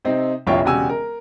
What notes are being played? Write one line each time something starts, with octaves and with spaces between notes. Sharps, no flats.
C3 C4 D#4
F1 A#1 E4 F4 C#5 G5
E1 C#3 F#4 G4 G#5 E6
A#4